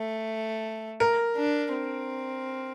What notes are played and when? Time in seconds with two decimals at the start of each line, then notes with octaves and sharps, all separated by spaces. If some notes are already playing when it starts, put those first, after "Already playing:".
Already playing: A3
1.00 A#4
1.36 D4
1.72 C4